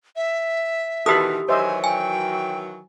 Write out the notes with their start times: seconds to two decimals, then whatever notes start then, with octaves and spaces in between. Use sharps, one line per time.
0.16 E5
1.06 B2 D#3 E3 G4 A4 B5 D#6
1.49 D#3 E3 F#3 C5 D#5 E5 G#5
1.84 G5 G#5